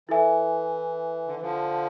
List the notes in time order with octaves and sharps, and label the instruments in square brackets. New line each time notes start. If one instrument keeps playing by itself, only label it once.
[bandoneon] E3 [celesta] E4 A4 E5 G#5
[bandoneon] D3
E3
D3 F3